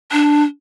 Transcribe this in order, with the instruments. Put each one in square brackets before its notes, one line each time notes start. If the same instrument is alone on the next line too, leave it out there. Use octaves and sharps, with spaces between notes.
[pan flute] D4